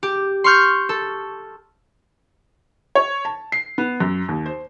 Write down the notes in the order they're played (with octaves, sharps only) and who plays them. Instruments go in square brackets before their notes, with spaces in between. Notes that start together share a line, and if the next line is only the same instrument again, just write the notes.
[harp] G4
C6 C#6 F6 G6
A4
[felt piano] C#5
A5
C7
B3
F#2
D#2
C5